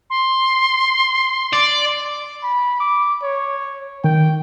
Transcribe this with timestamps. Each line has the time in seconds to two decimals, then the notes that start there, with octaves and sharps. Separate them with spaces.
0.10 C6
1.53 D5
2.43 B5
2.80 D6
3.23 C#5
4.04 D#3 G5